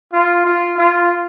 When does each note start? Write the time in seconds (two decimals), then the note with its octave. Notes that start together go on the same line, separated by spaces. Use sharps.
0.13 F4
0.45 F4
0.78 F4